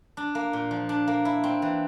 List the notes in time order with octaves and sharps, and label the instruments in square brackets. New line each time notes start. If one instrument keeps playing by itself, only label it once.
[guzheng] D4
A#3
A#2
F3
D4
A#3
E4
C4
E3